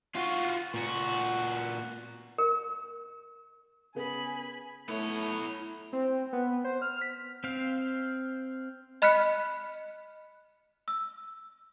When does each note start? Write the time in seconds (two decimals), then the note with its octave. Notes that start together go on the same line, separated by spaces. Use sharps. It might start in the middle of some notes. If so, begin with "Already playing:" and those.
0.15 F4 F#4
0.74 A#2 F#4
2.38 A#4
3.95 C#3 B3 G#4 G#5 B5
4.88 A3 B3 E4 C#5
5.93 C4
6.33 B3
6.64 C5
6.82 F6
7.01 B6
7.44 C4 F5
9.02 D#5 B5 F6 F#6 B6 C#7
10.88 E6